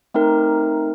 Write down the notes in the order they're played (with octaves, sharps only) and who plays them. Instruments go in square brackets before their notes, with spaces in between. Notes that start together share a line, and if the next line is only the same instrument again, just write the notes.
[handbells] A3 C4 D#4 A#4